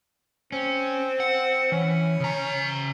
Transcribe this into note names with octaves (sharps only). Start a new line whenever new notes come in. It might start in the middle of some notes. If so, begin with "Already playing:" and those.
C4 C#4
F#5
E3 C#4
C#3 A#5